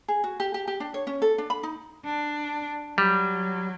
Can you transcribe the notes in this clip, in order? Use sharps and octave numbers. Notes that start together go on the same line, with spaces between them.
G#4
F#4
G4
G4
G4
D4
C#5
C#4
A4
D4
B5
D#4
D4
F#3 G3